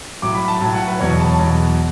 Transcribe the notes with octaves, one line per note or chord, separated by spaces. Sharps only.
A2 F#3 D6
B5
A5
A2 F#3 A5
F#5
B4
E2 B2 F#3 C#5
A5
E2 B2 F#3